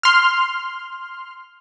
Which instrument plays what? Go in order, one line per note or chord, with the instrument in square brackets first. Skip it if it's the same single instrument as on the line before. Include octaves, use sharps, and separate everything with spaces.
[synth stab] C6 F6